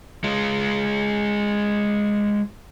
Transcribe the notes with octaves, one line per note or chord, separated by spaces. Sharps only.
G#3 F4